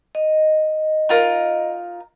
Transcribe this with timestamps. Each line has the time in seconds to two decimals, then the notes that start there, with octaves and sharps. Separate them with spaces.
0.15 D#5
1.09 D#4 F4 A#4